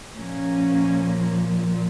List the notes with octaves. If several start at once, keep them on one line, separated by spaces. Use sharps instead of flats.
A#2 F3 A#3 C#4